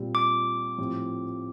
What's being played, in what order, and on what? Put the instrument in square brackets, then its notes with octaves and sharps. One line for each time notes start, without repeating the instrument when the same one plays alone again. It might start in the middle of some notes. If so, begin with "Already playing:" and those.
Already playing: [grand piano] A#2 G3 C4 G4
[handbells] D6
[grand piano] A2 F3 C4 G4